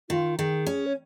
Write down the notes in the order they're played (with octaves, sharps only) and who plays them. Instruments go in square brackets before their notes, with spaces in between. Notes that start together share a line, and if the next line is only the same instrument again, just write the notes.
[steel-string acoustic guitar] D#3 [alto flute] F4
[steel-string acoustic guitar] D#3 [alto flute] G#4
[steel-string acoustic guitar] C#4
[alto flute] C#5